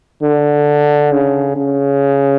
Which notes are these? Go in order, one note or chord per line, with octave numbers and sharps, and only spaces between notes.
D3
C#3
C#3